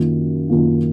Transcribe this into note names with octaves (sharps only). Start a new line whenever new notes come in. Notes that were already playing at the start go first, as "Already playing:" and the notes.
Already playing: F#2 D#3 A#3 F4
F#2 D#3 A#3 F4